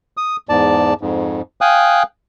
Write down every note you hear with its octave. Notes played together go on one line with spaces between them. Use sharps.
D#6
E2 G#2 D5 A5
F2 G#2
F5 G5 G#5 D#6 F#6